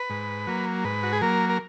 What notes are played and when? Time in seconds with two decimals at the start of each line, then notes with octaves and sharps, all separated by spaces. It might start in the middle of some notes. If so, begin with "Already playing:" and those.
Already playing: B4
0.10 G#2
0.47 F#3 A#3
0.84 G#2 B4
1.03 F#4
1.13 G#4
1.22 F#3 A#3 A#4
1.49 A#4